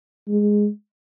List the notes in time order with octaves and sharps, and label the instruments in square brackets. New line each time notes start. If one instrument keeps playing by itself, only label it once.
[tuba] G#3